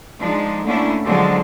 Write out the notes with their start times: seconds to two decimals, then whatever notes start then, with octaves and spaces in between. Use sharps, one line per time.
0.20 F3 G#3 D4 D#4
0.65 D3 A3 A#3 C#4 D4 E4
1.05 D3 F3 F#3 G#3 C4